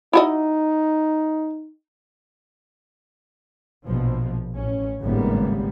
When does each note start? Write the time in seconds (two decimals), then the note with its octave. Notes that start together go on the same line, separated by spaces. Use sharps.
0.13 D#4 E4 F#4 D#5
3.87 A#1 B2 F3
4.55 A1 C#4
5.01 G#1 C#2 A2 G3 A#3 B3